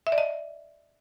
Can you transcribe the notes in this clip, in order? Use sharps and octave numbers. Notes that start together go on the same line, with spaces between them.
E5
D5
D#5